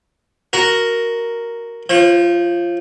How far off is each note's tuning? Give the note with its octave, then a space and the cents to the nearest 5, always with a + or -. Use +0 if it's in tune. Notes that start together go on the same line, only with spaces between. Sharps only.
F#4 +0 A#4 +0
F3 -15 C5 +45